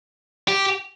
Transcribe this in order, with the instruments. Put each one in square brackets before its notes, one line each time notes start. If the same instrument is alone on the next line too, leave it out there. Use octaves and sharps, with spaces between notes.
[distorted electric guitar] G4